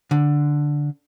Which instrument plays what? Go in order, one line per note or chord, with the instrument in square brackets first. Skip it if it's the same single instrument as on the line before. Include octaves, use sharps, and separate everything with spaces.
[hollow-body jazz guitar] D3